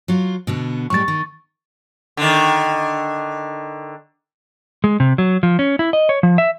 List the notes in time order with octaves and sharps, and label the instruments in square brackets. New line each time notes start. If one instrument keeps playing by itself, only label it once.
[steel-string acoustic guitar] F#3 F4
B2 D3 B3
[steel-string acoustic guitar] A2 G3 G#3 [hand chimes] C#6 A6
[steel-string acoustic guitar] D#3
[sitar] D3 D#3
[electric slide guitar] G#3
C3
F#3
F3
C#4
E4
D#5
C#5
F3
E5